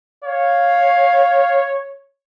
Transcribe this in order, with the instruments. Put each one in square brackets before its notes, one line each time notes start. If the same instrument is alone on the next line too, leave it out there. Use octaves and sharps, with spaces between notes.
[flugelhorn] C#5 [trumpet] F5